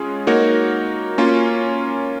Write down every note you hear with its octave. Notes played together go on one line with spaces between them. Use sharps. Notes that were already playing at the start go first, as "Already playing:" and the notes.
Already playing: G#3 C#4 F4 G#4
A#3 D#4 F#4 A#4 C#5
A#3 C#4 F4